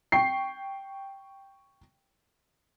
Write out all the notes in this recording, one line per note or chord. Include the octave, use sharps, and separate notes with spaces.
G5 C#6 C7